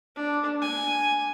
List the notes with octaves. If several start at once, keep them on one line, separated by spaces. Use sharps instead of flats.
D4
G#5